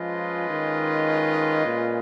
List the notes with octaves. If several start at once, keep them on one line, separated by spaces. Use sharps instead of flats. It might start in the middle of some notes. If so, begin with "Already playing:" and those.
Already playing: F3 G#3 C#4 F4 B4 D#5
D#3
A#2